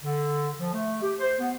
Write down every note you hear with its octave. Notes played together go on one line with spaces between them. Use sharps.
D3
F3
A3
G4
C5
B3